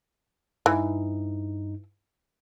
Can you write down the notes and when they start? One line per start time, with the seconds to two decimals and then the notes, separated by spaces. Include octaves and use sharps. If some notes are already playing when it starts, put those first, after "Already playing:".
0.66 G2 E3 D#4